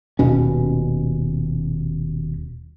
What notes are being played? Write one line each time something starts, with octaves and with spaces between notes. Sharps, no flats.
D#1 B2 C#4